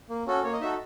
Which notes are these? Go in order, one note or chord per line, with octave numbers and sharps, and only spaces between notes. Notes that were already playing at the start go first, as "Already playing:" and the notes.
A#3
C#4 F#4 A4
A#3 C#5
D#5
D#4 F#4 A4 E5